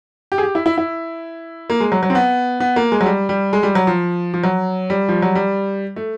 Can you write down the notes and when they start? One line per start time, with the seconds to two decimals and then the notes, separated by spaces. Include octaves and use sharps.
0.32 G4
0.38 G#4
0.43 G4
0.55 E4
0.66 E4
0.78 E4
1.70 A#3
1.80 G#3
1.92 F#3
2.03 F#3
2.10 C4
2.15 B3
2.60 B3
2.76 A#3
2.92 G#3
3.01 F#3
3.06 G3
3.29 G3
3.53 G#3
3.63 G3
3.75 F#3
3.87 F3
4.34 F3
4.44 F#3
4.90 G3
5.09 F3
5.23 F#3
5.35 G3
5.96 A3